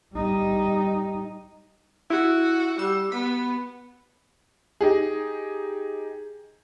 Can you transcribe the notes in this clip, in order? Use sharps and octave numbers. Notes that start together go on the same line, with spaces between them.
G3 D#4
E4 F#4
G3 E6
B3 B5
D#4 G4 G#4